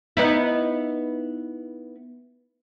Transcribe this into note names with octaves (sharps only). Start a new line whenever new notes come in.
B3 D#4 E4